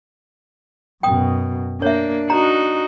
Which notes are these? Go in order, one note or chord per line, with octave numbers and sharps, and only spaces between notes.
F#2 B2 G5 D#6
A#3 D4 C#5 E5
D#4 F#4 A#5